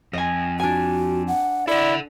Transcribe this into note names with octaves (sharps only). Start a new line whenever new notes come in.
F2 D#5 G#5
D4 F#4 G#5
F#5
E4 A4 D5 F#5